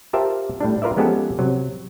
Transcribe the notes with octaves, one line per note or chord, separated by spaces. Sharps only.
F4 G4 A#4 C5 E5 A5
A2 G3 D4
F4 A#4 B4 D5 E5
F3 G#3 B3 C#4 G4 A4
C3 F#3